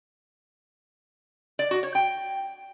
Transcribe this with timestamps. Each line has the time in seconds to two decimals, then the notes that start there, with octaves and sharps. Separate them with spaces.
1.59 D5
1.71 F#4
1.83 C#5
1.95 G5